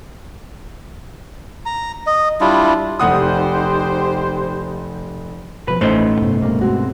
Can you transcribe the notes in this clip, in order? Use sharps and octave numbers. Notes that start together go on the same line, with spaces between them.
A#5
D#5
G3 D4 E4 F4
F1 D#4 G4 C5 F#5 D#6
B2 E3 F3 B4
A1 A2 A3 C#4 D#4 C5 D#5
G2 C3 B3
C#2 G2 B2 A#3
G#3 C4 F#4